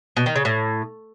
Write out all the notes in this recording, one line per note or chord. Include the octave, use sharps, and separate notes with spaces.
B2
D#3
C#3
A2